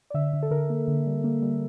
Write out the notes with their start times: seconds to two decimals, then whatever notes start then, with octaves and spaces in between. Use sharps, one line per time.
0.10 D5
0.14 D3 E5
0.33 D3
0.43 A4
0.51 D3 A#4
0.70 A#3
0.88 D3
1.06 G3
1.24 A#3
1.42 G3